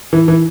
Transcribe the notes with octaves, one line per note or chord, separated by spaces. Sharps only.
E3
E3